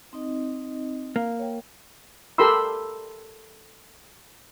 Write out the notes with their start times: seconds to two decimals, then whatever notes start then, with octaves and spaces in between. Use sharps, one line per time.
0.13 C4 D#4 D#5
1.16 A#3
1.39 C#5 G5
2.38 G4 A4 A#4 B5 C6 E6